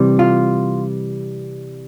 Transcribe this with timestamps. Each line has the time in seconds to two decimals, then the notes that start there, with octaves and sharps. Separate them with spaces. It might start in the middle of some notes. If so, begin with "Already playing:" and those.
Already playing: C3 E3 G3
0.19 F4